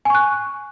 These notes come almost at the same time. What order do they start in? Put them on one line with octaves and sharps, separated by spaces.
G#5 C#6 F#6